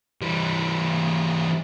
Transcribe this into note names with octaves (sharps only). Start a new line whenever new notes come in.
E3 G3